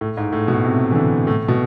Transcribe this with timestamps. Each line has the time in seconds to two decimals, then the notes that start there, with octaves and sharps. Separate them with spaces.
0.01 A2
0.17 G#2
0.32 A2
0.48 B2
0.64 C3
0.91 E3
0.95 D3
1.27 A2
1.48 B2